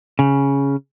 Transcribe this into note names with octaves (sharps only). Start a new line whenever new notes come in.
C#3